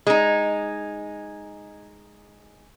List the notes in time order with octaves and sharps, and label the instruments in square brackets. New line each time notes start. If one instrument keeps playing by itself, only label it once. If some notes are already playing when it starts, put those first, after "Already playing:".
[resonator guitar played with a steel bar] G#3 D#4